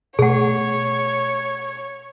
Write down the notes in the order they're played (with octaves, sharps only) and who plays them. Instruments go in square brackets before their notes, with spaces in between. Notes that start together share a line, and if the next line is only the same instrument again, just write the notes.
[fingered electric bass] B2 A3 [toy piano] G#4 F#5 [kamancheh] C#5